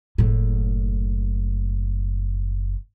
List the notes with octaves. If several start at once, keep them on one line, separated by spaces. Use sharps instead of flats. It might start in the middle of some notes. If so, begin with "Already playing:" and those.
F#1 A2